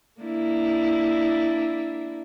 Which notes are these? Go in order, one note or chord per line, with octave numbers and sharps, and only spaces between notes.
A#3 D4 E4